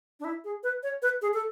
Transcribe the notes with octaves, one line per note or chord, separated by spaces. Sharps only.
D4
E4
G#4
B4
C#5
B4
G#4
A4